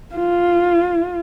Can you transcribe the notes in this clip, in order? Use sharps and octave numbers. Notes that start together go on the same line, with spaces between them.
F4